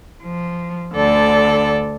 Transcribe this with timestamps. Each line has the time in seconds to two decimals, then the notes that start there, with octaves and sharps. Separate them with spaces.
0.22 F3
0.93 D2 D3 A4 D5